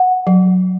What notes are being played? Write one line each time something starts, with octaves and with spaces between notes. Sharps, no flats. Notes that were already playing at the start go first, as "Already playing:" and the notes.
Already playing: F#5
F#3